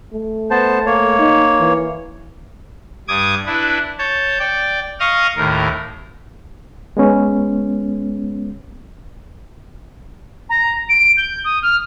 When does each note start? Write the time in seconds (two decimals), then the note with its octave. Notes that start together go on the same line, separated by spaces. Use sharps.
0.13 A3
0.51 B3 C5 A5
0.86 A#3 C#5
1.19 D#4
1.60 E3
3.08 G2 D6 D#6 G#6
3.46 D4 E4 B4
3.99 C#5 A5 G6
4.39 D5 G5
5.00 D#5 F5 C#6 D#6 F6
5.37 D#2 A2 A#4
6.97 G#3 B3 C#4
10.49 A#5
10.89 D7
11.17 G6
11.44 D#6
11.62 F6